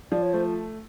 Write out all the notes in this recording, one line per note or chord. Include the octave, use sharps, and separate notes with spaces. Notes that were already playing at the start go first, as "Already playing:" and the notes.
F3 D5
C#5
A3 C5